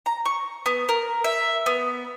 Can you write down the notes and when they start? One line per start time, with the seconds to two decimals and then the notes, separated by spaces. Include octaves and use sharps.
0.06 A#5
0.26 C#6
0.66 B3
0.89 A#4
1.24 E5
1.66 B3